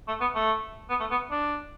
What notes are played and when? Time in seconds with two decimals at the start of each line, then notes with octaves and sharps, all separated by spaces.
0.08 A3
0.21 B3
0.35 A3
0.89 B3
1.00 A3
1.11 B3
1.31 D4